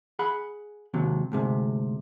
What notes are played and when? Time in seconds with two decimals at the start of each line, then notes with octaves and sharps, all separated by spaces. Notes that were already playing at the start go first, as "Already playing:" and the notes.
0.19 G#4 F#5 B5
0.94 D#2 G#2 C3 F#3
1.32 D2 G#2 C3